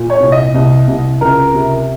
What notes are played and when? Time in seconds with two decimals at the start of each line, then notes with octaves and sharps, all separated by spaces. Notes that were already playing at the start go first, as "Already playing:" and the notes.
Already playing: A#2
0.10 C#5
0.20 C2
0.32 D#5
0.54 C2
0.88 C2
1.21 C#2 A#4
1.55 C3